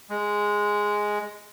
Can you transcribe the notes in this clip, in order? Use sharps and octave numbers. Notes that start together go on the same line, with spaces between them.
G#3